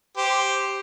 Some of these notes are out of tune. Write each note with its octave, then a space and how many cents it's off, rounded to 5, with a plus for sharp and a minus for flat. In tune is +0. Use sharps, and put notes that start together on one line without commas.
G4 +0 C5 +0